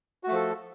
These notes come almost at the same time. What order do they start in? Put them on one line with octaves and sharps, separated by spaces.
F#4 A3 F3 A4